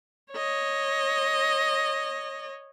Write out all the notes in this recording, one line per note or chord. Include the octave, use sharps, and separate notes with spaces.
C#5 D#5